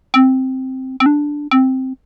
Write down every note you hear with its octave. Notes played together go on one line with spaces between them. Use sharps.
C4
C4
D4
C4